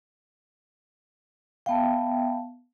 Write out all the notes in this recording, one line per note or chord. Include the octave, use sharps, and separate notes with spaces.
B3 E5 F5 G5 A5